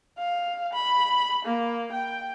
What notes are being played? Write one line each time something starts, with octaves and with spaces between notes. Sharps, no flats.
F5
B5
A#3
G5